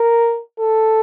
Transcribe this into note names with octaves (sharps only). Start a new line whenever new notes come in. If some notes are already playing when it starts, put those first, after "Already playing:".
Already playing: A#4
A4